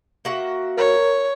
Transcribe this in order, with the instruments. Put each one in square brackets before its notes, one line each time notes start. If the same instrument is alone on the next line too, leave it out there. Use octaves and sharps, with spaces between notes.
[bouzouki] A#3 F#4 E5
[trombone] A#4 [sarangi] C#5